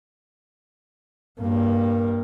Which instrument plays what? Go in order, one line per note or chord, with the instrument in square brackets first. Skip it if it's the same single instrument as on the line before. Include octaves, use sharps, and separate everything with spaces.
[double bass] G2 A#3